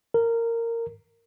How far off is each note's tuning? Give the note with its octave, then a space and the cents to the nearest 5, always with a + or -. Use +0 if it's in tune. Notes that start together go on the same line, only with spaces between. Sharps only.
A#4 -15